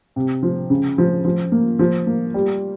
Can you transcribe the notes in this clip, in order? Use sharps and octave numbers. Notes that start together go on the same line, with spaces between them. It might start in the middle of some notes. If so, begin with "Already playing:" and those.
C3
F3
C#3
F3
F3
A#3
F3
A#3
G3